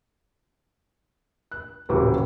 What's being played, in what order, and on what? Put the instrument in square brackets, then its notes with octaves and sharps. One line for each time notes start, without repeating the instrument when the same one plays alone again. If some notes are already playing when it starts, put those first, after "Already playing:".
[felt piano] F#6
D#1 A1 A2 C#3 F#4 G4